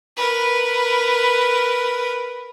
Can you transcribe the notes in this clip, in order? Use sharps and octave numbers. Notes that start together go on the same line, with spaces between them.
A#4 B4